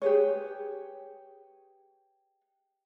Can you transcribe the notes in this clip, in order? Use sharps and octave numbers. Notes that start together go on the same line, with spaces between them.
G4 G#4 B4 C#5